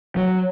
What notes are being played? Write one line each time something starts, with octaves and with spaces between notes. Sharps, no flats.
F#3